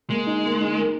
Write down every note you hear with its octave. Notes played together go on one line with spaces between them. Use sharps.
G#3 A#3
D#4
A#3
D#4
A#4